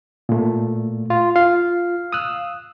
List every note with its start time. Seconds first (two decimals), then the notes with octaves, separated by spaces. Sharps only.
0.29 A#2 A3
1.10 F4
1.36 F4 F5
2.13 D#6 E6 F#6